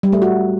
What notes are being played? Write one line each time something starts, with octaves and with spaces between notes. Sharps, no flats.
G3
A3
F#4